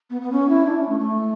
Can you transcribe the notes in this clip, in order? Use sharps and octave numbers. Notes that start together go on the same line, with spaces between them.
B3
B3
C#4
E4
D4
C#4
A3
A3